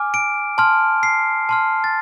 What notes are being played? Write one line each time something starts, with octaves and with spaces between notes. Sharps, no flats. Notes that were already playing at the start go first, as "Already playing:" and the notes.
Already playing: G#5 D6 F6
D7
A5 C6 F6
C7
A5 C6 F6
A6